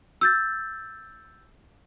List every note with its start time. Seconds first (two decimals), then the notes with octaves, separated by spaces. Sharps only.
0.21 E6 G6 A6